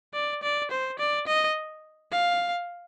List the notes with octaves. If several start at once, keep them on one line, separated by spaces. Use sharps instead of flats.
D5
D5
C5
D5
D#5
F5